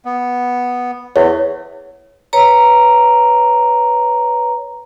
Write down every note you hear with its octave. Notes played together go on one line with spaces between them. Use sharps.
B3
E2 C#5
B4 C#5 A#5